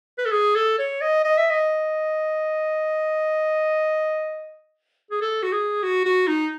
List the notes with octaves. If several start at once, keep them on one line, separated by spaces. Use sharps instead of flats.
B4
A4
G#4
A4
C#5
D#5
D#5
E5
D#5
G#4
A4
F#4
G#4
F#4
F#4
D#4